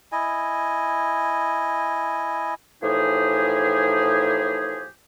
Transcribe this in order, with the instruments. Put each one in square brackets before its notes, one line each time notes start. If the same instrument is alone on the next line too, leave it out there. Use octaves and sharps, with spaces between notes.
[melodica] E4 D#5 G#5
[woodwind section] A2 E3 F3 D#4 G4 G#4